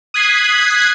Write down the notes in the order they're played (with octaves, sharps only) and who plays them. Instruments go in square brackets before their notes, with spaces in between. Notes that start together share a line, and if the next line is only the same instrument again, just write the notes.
[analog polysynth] D#6 F#6 G#6 B6 C7